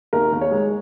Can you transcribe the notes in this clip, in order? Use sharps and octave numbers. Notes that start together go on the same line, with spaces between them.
D#2 A#4
D#2
C#5
G#3